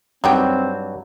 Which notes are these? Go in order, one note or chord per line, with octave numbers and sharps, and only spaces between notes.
G2 F#3 C4 D4 D#4 G5